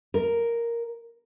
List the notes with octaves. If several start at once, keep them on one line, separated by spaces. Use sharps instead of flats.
A#4